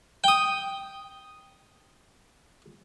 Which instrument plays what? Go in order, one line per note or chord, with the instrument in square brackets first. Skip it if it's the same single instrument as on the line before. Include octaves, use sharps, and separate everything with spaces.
[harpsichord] G5 D#6